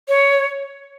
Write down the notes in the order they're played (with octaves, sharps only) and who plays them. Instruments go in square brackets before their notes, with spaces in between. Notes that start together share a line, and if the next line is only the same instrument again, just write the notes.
[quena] C#5